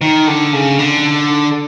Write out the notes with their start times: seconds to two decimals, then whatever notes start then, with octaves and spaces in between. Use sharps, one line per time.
0.01 D#3
0.27 D3
0.53 C#3
0.79 D3